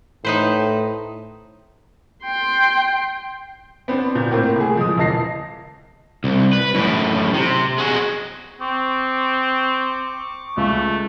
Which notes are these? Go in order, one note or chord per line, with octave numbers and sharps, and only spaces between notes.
A2 D#4 B4 C5
G5 C6
B3 C4 D4
A#2 F#4 G6
A2 A#3 C4
C2 A3 G#4
F3 G#3 D#6
E1 E2 D#5 A5 A#6 C7
C2
B4
F#2 A2
C3
G#3 F#4
C4 C#6 D6
C#2 A3